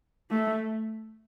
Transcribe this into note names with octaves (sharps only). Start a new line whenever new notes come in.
A3